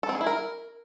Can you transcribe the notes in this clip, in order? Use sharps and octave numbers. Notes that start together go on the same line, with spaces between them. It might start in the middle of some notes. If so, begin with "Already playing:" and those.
A4
C4
G#4
E4
A#4